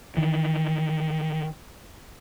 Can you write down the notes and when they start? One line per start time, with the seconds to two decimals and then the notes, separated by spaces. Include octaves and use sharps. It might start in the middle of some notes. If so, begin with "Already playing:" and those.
0.17 D#3 E3